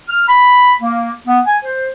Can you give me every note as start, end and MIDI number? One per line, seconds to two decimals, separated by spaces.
0.09 0.27 89
0.28 0.72 83
0.81 1.10 58
1.28 1.40 59
1.46 1.58 80
1.64 1.89 72